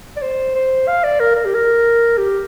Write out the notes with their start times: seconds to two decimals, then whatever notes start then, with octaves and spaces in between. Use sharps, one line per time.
0.17 D5
0.22 C5
0.55 C5
0.88 F5
1.04 D5
1.20 A#4
1.35 A#4
1.45 G4
1.54 A#4
2.18 G4